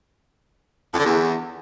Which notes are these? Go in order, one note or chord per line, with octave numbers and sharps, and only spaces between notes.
F2
D3
E2